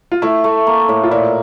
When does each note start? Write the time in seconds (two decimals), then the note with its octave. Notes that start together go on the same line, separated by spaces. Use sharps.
0.12 F4
0.22 A3 E4
0.44 A3
0.67 A#3
0.89 A2
1.03 F4
1.11 A#2 E4